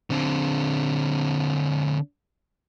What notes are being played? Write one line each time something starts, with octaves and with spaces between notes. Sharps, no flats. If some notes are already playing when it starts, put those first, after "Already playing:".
D3 C4